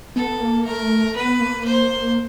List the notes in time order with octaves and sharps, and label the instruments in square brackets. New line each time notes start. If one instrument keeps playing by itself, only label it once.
[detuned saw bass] B3 [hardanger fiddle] A4
[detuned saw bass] A#3
[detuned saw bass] A3 [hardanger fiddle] A#4
[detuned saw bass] B3 [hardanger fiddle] B4
[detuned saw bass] A#3
[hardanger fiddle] C5